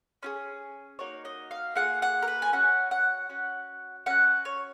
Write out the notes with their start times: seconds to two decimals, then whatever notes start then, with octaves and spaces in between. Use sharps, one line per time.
0.23 C#4 F4 G#4
0.99 A#3 D#4 F#4 C#5
1.25 D#5
1.51 F5
1.75 A#3 F4 G#4 F#5
2.02 F#5
2.22 A#4
2.27 B4
2.42 G#5
2.53 C#4 F#4 F#5
2.91 F#5
3.29 C#4 F#4
4.06 C#4 F#4 F#5
4.45 C#5